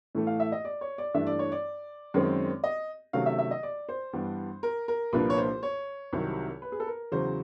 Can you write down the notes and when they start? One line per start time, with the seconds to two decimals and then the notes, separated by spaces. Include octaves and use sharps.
0.15 A2 E3 A3
0.27 F5
0.40 E5
0.52 D#5
0.65 D5
0.81 C#5
0.98 D5
1.14 G2 E3 A3 D4 E5
1.27 D5
1.39 C#5
1.52 D5
2.14 F#2 D#3 G#3 C4
2.64 D#5
3.13 C3 D#3 F#3 A3 C#4 F5
3.26 E5
3.38 E5
3.51 D#5
3.63 D5
3.89 C5
4.13 G2 E3 G3 B3 D4
4.63 A#4
4.88 A#4
5.13 C2 A#2 F3 A#3 D4 B4
5.30 C#5
5.38 C5
5.63 C#5
6.13 C2 C3 D#3 F#3
6.62 B4
6.72 G#4
6.80 A4
6.87 A#4
7.12 E2 C#3 F#3 C5